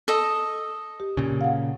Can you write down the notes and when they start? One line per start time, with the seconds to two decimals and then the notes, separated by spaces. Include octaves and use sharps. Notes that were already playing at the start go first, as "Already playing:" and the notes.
0.08 A4 D#5
1.00 G4
1.17 A#2 C#3
1.41 F5 F#5